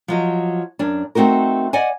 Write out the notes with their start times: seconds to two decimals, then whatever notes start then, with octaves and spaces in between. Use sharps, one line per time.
0.08 F3 F#3 D#5
0.79 F#2 D4
1.15 A3 C4 D#4 F#4 A#4
1.73 D5 D#5 F#5 G#5